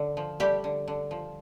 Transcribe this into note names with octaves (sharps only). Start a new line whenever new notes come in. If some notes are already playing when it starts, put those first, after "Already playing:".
Already playing: D3
F3
G3 A3 G4
D3
D3
F3